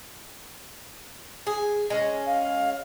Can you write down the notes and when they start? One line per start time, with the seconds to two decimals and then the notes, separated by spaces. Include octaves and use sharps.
1.47 G#4
1.90 G#3 C#4
2.26 F5